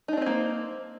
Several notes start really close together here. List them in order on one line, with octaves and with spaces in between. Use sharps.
D#4 D4 C4 C5 A#3